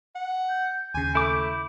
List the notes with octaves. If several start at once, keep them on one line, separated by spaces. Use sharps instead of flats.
F#5
G6
D#2 C#3 G#5
A3 E4 D6